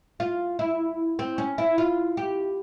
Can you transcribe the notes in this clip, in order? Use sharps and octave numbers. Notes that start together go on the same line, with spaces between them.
F4
E4
C4
C#4
E4
F4
G4